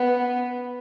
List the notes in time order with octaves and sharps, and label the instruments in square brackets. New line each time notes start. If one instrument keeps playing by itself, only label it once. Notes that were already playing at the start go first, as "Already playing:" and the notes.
Already playing: [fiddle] B3